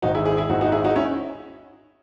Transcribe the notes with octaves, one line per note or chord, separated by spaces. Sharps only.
G#1 G#2 D#3 D#4 F#4
E4 G#4
E4 G#4
E4 G#4
G#1 G#2 D#3 D#4 F#4
D#4 F#4
E4 G#4
D#4 F#4
C#4 E4